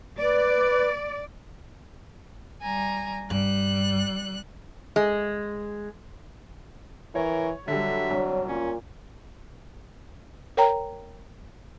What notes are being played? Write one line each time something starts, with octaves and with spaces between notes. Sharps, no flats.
B4 D5
G3 G#5 A#5
G2 G3 F#6
G#3
E3 A#4 C#5
D3 F#3 G3 E5
C2 D4 C#5
A#2 C#4
A#4 C#5 G5 A#5